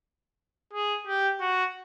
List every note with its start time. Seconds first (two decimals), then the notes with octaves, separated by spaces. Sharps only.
0.73 G#4
1.07 G4
1.40 F#4